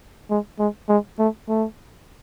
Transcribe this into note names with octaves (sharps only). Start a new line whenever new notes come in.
G#3
G#3
G#3
A3
A3